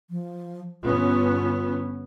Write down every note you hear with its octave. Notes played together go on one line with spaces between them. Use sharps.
F3
G1 B3 C#4 F4